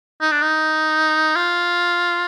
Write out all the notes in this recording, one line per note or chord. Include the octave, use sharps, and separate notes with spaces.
D#4
D4
D#4
F4